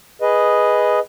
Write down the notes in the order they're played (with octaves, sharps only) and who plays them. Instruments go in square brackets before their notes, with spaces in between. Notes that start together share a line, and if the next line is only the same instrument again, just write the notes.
[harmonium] G#4 B4 D#5